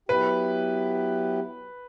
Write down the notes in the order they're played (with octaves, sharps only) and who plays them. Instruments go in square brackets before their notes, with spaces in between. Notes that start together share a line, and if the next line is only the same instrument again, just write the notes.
[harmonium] F#3 B3 E4 G4 [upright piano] B4